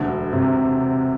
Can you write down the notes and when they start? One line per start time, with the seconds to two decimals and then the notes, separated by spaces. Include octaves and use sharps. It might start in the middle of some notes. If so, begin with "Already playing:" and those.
Already playing: E1 D2 D3 A3
0.33 C3